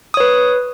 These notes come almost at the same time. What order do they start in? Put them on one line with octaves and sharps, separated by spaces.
D#6 C#5 B4